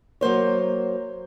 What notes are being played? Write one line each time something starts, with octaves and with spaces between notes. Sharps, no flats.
F#3 A#3 C5 C#5